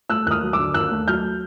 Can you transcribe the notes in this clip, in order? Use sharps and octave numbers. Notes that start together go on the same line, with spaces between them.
A3 E6 F#6
D#2 D#6 F6 F#6
F#3
D6 E6
D3
D#2 E6 F#6
A3
F#3 F6 G6